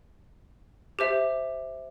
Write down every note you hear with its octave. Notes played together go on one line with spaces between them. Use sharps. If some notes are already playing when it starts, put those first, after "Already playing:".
G4 C5 E5